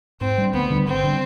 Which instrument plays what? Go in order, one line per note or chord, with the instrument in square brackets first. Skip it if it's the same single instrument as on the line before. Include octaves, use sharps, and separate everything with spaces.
[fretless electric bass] G#2 [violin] C4
[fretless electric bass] G3 D4
[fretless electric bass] D2 [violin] B3
[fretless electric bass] D3 G3 D4
[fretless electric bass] G#1 [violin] C4
[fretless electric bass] D3 G3